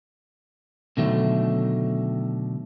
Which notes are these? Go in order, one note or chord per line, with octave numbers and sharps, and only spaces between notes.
B2 D3 D#3 F#3 A3